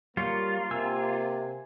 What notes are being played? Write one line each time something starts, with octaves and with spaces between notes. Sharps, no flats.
G3 A#3 F4 C#5
C3 G#5 E6